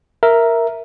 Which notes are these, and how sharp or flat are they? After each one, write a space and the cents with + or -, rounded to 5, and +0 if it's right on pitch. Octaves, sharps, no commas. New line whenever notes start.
A#4 +0 E5 +0